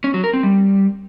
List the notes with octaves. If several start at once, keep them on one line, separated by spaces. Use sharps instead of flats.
C#4
F#3
A#4
C4
G3